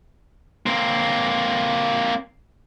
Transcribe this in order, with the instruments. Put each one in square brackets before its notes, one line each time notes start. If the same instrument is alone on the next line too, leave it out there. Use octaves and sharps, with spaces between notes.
[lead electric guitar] A#3 C4